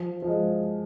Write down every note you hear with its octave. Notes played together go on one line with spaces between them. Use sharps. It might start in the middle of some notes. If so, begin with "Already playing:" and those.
Already playing: F3
F3
G#3